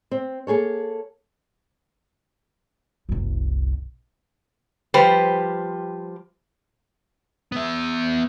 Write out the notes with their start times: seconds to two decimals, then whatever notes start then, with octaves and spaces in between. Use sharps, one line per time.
0.11 C4
0.47 A#3 G#4 A4 C#5
3.09 F#1 C2
4.94 F3 G3 G4 B4 C5
7.52 B3 E5